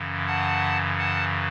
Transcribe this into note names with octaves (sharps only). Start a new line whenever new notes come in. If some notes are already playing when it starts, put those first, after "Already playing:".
Already playing: F#2 C#3 E3
F#5 A5
F#5 A5